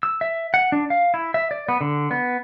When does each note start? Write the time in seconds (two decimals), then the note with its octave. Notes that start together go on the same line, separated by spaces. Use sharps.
0.03 E6
0.21 E5
0.54 F#5
0.72 D4
0.90 F5
1.14 E4
1.34 E5
1.51 D5
1.69 B3
1.81 D3
2.11 B3